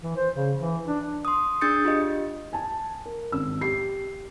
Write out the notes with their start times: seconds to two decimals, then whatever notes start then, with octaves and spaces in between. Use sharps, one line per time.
0.03 E3
0.17 C5
0.35 C#3
0.59 E3
0.87 D4
1.25 C6 D#6
1.61 D4 G#4 D#6 G6 A6 C#7
1.85 F4 G4 D#5
2.53 G#5 A5
3.06 A#4
3.32 G#1 E6
3.61 G4 C7